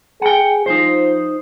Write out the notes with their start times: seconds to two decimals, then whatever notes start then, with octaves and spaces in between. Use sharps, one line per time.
0.21 G#4 F#5 G5
0.66 F3 D#4 C5